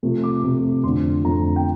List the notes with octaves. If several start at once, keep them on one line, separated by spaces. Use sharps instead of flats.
C3 F3 A3
D6
C3 F3 A3
F2 D3 A3 C6
F2 D3 A3 A#5
G5